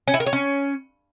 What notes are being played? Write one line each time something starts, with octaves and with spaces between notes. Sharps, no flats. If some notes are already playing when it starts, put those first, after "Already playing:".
C#4
E4
A#4
C#5
C#4